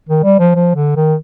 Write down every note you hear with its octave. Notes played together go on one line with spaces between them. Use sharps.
D#3
G3
F3
F3
D3
D#3